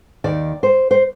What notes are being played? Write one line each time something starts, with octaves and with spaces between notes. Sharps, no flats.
D#2 D#3 D5
C5
C5